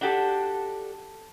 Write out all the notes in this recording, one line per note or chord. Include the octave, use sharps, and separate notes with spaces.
D4 F#4 G4 A4